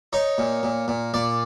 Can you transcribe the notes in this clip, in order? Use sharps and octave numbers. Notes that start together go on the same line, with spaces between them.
D#4 C#5
A#2
A#2
A#2
A#2 D5